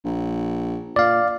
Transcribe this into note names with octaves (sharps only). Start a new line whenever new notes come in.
A#1
A#2 D5 F5